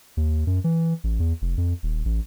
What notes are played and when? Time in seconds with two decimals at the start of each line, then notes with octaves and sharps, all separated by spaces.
0.17 D#2
0.47 F#2
0.64 E3
1.04 A1
1.20 E2
1.42 F1
1.58 F2
1.83 D#1
2.05 A1